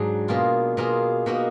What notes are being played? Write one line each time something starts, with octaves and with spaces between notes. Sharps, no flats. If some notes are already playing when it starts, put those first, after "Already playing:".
Already playing: G#2 F#3 D4 G#4
B2 A#3 F4 G#4
B2 A#3 F4 G#4
B2 A#3 D#4 F#4